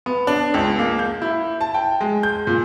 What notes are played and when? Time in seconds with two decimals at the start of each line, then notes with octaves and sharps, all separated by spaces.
0.06 B3
0.27 D4
0.54 C#2
0.79 A#3
0.99 G6
1.22 E4
1.61 A5
1.74 G5
2.01 G#3
2.23 G6
2.47 A#2